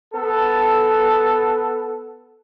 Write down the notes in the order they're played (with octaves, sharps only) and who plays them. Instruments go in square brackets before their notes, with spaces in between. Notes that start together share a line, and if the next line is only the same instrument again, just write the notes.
[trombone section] B3 A4